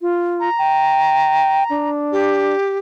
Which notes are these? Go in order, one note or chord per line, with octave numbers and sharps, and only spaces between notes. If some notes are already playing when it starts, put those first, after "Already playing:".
F4
A#5
G5
D4
G4